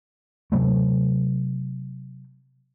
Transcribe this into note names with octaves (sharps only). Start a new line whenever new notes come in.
C3 F#3 A3